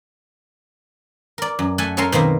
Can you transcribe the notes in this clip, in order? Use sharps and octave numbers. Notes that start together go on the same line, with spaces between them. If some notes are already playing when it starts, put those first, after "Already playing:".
A#4 D5
F#2
A3 A4 F#5 G#5
F#3 C#4 A4 A#4 C6
B2 D#3 A#3 C4